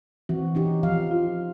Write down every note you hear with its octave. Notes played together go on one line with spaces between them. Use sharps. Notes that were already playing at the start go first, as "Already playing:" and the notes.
E3 C4 F#4
C#4 D#4 G4
F3 F5
F4